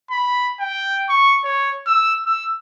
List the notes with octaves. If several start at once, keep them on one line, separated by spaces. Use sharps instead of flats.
B5
G5
C#6
C#5
E6
E6